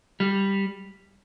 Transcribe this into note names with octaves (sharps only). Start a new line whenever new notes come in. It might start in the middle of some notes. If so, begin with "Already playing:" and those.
G3